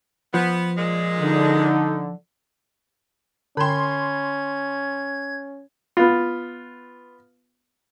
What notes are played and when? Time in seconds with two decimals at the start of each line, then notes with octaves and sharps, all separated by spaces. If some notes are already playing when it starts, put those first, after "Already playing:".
0.34 F3 B3
0.78 A#2 G#3
1.20 D3 D#4
3.57 D3 C#4 G5 B5 C6 G#6
5.97 B3 F4